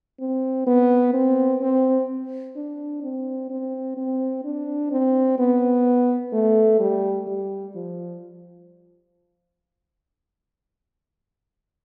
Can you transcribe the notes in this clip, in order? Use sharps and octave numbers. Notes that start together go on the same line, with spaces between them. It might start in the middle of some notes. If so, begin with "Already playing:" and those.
C4
B3
C4
C4
D4
C4
C4
C4
D4
C4
B3
A3
G3
G3
F3